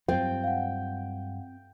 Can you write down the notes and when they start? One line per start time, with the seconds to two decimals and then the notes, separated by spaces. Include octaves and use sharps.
0.08 G2 F#3 G3 C4 F4 G5
0.44 F5 F#5